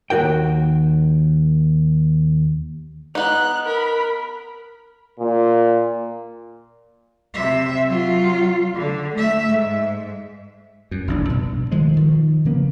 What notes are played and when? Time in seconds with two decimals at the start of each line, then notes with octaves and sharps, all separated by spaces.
0.10 D#2 C#3 F#4 A#4 G5
3.15 B3 D#4 F#6
3.64 A#4 B5
5.20 A#2
7.34 C3 E5
7.86 F#3 F4
8.75 D3
9.15 A3 E5
9.49 G#2
10.91 F#2
11.07 F1 A#1 D4
11.26 G2 B2
11.72 D2 D#3 F3 G#3
11.97 D#3 F3
12.45 C#3 F3 A#3 B3